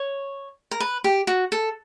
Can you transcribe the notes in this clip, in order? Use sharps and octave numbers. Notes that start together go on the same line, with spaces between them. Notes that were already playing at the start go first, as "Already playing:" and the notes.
Already playing: C#5
A#4
B4
G4
F#4
A4